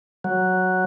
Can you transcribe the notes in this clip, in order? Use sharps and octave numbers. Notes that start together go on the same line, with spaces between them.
F#3